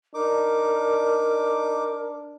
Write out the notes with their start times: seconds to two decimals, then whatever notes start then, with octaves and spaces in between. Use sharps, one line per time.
0.14 D4 D#4 A#4 D6